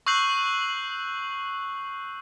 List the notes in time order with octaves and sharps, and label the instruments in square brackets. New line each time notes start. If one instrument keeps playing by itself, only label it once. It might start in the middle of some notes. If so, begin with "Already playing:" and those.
[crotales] C#6 E6 F#6 G6 C7 F#7